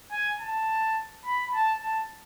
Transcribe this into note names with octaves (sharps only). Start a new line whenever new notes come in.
G#5
A5
B5
A5
A5